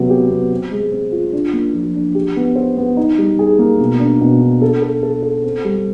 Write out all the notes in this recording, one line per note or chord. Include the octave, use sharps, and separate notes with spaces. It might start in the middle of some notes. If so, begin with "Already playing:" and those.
Already playing: C3 F#3 B3
G4
B3
C4
G#3
C4
F4
D4
A#3
F3
D4
G4
B3
C5
B3
D#4
G3
G#4
A#3
B2
D4
B2
D4
A4
A4
A4
A4
C4
G3